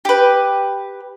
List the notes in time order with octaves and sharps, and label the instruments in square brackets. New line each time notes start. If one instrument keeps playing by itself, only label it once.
[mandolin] G4 B4